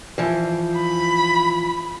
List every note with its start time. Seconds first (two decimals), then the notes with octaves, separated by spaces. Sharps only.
0.18 E3 F3
0.75 B5